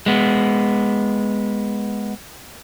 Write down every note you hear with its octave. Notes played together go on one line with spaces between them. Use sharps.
G#3 B3